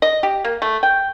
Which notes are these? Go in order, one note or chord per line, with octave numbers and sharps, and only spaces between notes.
D#5
G4
A#3
A3
G5